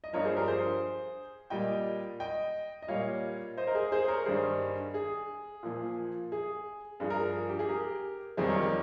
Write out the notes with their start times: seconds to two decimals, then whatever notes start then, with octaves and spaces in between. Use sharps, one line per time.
0.04 D#5
0.13 G2 F3 A#4 C#5
0.25 G#4 C5
0.37 G4 A#4
0.47 G#4 C5
1.50 A#2 G3 D#5 G5
2.20 D#5 G5
2.82 D#5
2.88 A#2 G3 C#5 F5
3.57 C5 D#5
3.67 A#4
3.75 G#4
3.92 G#4 C5
4.08 A#4 C#5
4.26 G2 D#3 G3 G#4 C5
4.94 G#4
5.63 A#2 F3
6.32 G#4
7.00 G2 F3 G#4
7.10 A#4
7.19 G#4
7.49 G4
7.59 G#4
7.69 G4 A#4
8.37 F2 D#3 G3 G#4 C5
8.49 A#4 C#5
8.61 G4 A#4